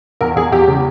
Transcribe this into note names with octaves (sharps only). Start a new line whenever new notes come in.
E2 A#4
E2 G#4
E2 G4
C#3